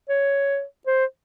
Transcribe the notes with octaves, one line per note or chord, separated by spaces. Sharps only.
C#5
C5